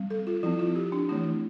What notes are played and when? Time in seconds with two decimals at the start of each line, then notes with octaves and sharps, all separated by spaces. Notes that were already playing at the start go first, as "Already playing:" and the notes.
Already playing: G3 C4
0.10 A4
0.27 F4
0.43 F3 E4
0.46 C4
0.59 F4
0.76 G4
0.92 D4
1.09 E3 A3 C4 E4